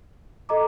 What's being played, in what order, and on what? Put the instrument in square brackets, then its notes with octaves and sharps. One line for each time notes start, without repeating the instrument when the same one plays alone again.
[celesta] A4 D#5 A#5 D6